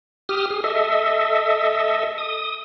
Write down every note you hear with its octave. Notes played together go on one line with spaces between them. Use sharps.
G4 D#6 F6
G#4
A4 D#5 E5
D#6